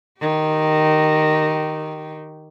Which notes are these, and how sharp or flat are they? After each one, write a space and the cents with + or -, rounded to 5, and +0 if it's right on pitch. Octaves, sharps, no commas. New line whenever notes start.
D#3 -5 G4 -25